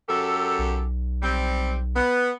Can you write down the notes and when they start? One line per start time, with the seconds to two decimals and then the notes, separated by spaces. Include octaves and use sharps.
0.09 F#2 G4 A4
0.59 B1
1.23 G3 C4
1.96 B3